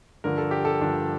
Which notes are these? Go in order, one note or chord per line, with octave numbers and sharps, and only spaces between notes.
G2 D3 F3 A#4
A4
G4
A4
G2 D3 F3 D4